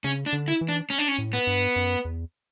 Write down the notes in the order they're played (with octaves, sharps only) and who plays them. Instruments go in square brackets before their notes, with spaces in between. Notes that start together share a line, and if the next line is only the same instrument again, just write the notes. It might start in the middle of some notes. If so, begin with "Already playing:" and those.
[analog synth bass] C#3 [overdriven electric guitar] C#4
[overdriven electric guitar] D4
[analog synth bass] D3
[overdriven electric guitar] E4
[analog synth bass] E3
[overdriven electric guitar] D4
C#4
D4
C#4
[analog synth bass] A2
[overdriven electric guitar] B3
[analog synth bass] G2
F#2
E2